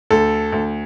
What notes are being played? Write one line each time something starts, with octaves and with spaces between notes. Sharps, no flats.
D2 A4
D2